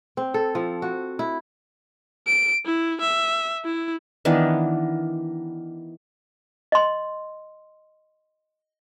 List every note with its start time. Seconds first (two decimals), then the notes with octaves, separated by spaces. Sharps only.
0.17 C4
0.34 A4
0.55 F3
0.82 F#4
1.19 E4
2.27 D7
2.66 E4
3.01 E5
3.65 E4
4.25 D#3 E3 B3 D4
6.72 D#5 C6